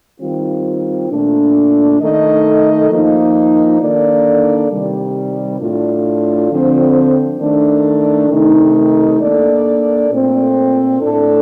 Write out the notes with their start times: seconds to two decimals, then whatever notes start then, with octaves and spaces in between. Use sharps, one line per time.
0.19 D#3 G3 C4 F4
1.09 A#2 A3 D4
1.99 D#3 A3 D#4 A4 D#5
2.90 F3 A#3 D#4
3.80 D#3 A#3 D4 A4 D5
4.69 C3 D#3 G3
5.59 A2 A3 D4 F4
6.50 D3 F3 C4
7.40 D#3 A3 D4
8.30 C3 D#3 A3 D#4
9.20 A#3 D4 A4 D5
10.10 A#2 A3 C4
11.00 A2 A3 D4 A4